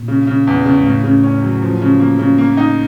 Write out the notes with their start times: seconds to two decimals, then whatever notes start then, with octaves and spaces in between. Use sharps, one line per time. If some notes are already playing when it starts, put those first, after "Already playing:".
Already playing: A#2
0.08 C#3
0.27 C#3
0.47 E2
0.66 C#3
0.80 G#2
0.86 A2 C#3
1.04 C#3
1.23 C#4
1.43 F#3
1.62 F3
1.82 C#3
2.00 A#3
2.19 C#3
2.38 A#3
2.57 D#4